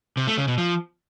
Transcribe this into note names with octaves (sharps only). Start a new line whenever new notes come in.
C3
A3
C#3
B2
F3